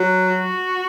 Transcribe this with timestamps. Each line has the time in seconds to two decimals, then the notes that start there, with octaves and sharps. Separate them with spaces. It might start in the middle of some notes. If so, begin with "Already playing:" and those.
Already playing: F#3
0.29 F#4